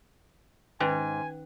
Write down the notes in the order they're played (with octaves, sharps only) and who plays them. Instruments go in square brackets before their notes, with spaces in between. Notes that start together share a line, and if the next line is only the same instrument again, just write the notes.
[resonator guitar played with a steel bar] G#2 [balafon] D#3 C#4 D#4 [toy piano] B4 G5 [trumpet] G#5